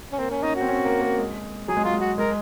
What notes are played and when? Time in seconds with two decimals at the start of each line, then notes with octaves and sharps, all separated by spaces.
0.12 C#4
0.18 A#3 C4
0.31 C#4
0.43 C#4 D#4
0.56 C4 F#4
0.69 C#4
0.85 A#3
1.01 A#3
1.18 G#3
1.68 F#3 G#4
1.77 G#3
1.84 F#3 F4
1.94 G#3
2.01 F#4
2.18 G#3 A#4